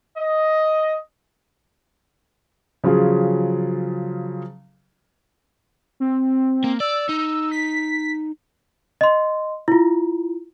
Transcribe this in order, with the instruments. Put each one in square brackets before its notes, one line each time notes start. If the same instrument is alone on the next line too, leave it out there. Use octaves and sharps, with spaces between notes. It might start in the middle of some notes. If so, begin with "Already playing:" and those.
[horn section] D#5
[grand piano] C#3 F3 F#3 F4 G#4
[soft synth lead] C4
[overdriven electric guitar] A#3
[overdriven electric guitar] D5 [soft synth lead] E6
[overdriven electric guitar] D#4
[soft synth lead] B6
[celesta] D#5 C6
E4 F4